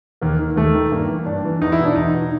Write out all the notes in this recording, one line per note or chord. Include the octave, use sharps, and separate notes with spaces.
D#2 A#3
D#3
D#2 A3
D#3
G2 A#3
E3
G2 D4
E3
E2 D#4
E4
B2
D4
E2 D#4
B2